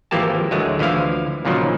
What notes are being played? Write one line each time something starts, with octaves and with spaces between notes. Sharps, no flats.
G#1 E3 F3 A#3 G4 A5
D2 F#3 G#3 A3
D2 E3 F3 E4 F5
C#2 A#2 D#3 F3 F#3